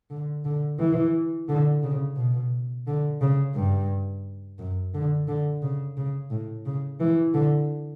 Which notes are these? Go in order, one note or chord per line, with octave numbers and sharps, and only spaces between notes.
D3
D3
E3
D3
C#3
B2
D3
C#3
G2
F#2
D3
D3
C#3
C#3
A2
C#3
E3
D3